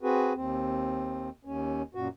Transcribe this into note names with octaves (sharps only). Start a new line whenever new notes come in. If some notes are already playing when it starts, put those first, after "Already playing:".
C4 F#4 G#4 B4
D#2 C4
D#2 C#4
F#2 A#2 F#4